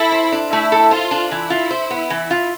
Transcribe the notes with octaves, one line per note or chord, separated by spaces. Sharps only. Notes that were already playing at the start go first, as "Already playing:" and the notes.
Already playing: E4 A4
C5
D4
A3 E4
A4
F4 C5
D4
E3 E4
F4
C5
B3
E3
F4